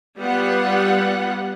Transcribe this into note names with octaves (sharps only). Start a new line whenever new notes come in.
G3 B3 F4 F#5